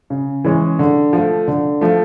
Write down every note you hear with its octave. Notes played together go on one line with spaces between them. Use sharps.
C#3
E3 G#3 C#4
D3
F3 A3
D3
F3 A3